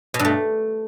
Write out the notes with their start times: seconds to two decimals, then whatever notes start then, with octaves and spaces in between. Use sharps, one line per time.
0.14 B2
0.19 G2
0.25 A3